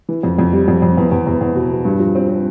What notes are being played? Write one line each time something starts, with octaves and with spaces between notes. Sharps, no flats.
E3
F2
F2
G3
F2
F2
E2
E2
E2
E2
B2
B2
G2
F3
C4
C4